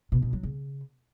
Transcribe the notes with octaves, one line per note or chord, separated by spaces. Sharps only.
B2
B2
F#3
C#3